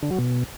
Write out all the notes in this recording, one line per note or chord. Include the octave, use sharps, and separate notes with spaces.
D3
F#3
B2